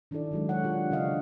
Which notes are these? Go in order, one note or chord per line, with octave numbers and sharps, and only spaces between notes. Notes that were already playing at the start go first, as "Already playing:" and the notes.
D#3 D4 E4 A4 D5
D#3 F#3 G#3
C#5 F#5
D4 F4 G4
C#3 E3 D4 D#5 F5